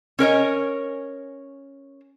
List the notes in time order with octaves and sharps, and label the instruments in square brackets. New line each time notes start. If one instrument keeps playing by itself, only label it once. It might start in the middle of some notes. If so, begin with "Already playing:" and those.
[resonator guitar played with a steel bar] C#4 A#4 C#5 D#5